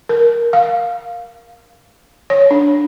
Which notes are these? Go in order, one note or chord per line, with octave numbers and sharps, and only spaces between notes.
A#4
F5
C#5
D4